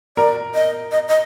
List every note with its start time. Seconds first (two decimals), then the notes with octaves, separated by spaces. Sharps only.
0.17 A#4 D5
0.54 D#5
0.92 D#5
1.08 D#5